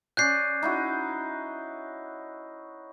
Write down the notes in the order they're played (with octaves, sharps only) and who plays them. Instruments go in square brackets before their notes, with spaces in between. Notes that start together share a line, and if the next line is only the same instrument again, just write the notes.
[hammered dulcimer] C#4 D5 G#5 [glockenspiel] F#6 G6 C7
[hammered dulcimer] D#4 E4 F#4